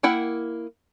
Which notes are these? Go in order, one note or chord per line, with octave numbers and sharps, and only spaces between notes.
A#3 E4 F#5 G5